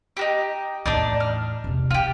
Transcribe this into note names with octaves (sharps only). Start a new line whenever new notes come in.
D#4 F#4 G4
E2 A2 D4 D#4 D5
F6
E2 C3
D#4 F4 G4